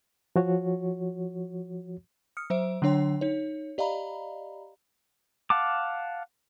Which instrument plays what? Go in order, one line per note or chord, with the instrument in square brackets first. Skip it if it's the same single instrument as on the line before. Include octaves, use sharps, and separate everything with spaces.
[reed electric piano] F3 F#4 C#5
[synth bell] D#6 F6 C#7
F#3 C5 E5 D7
D3 F#3 D4 C#5 G5 C6
D#4 C#5
G4 D5 D#5 F5 A#5 B5
[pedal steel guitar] F5 F#5 A5 D6